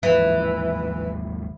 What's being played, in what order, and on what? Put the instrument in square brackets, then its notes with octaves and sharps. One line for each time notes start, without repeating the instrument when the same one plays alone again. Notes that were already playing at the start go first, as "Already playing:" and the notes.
[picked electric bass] D#2 G#2 F3 [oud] E3